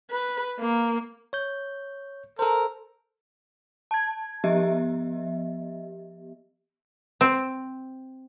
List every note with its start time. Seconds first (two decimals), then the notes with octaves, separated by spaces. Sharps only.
0.11 B4
0.59 A#3
1.33 C#5 G6
2.39 A4 A#4 C5
3.91 A5 G#6
4.44 F3 B3 G4 D#5 E5
7.21 C4